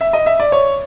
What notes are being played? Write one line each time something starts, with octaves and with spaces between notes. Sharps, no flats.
E5
D#5
E5
D5
C#5